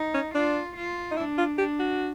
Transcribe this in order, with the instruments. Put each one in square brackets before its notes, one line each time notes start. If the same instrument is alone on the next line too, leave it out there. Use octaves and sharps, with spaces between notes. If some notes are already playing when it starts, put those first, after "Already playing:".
Already playing: [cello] D#4
[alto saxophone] C#4
[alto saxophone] D4 [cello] F4
[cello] F4
[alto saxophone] D#4
[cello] D4 [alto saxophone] E4
[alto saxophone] F4
[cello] D4 [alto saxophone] G4
[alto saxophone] F#4